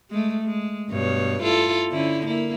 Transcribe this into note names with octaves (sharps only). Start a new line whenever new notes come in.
G#3 A3
G#3
G2 B2 C#5
E4 F4 A4
D3 C#4 E4
A#3 E4